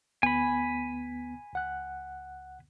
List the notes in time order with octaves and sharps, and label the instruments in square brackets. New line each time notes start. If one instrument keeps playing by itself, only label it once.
[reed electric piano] D2 B3 [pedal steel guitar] G#5 B5
[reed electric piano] C#2 F#5 F#6